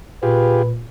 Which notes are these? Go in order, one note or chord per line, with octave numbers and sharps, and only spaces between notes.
A#2 F4 G4 G#4 B4